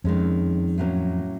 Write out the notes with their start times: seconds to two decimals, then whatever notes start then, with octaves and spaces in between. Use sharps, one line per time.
0.04 F2 D#3 G#3 C#4
0.78 A2 F#3 A#3 C#4